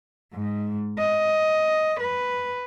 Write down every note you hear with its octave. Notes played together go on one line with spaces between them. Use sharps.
G#2
D#5
B4